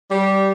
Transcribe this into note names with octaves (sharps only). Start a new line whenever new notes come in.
G3